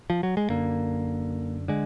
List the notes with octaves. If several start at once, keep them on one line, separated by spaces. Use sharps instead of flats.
F3
F#3
G#3
F#2 D3 A#3
D3 G#3